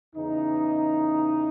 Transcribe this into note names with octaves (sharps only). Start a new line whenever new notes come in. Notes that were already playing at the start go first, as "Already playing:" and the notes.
E2 C#3 E3 D#4